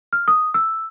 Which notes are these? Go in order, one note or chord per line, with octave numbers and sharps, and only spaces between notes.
F6
D#6
E6